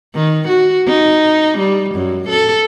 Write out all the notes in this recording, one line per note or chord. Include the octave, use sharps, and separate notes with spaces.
D#3
F#4
D#4
G3
F#2
A4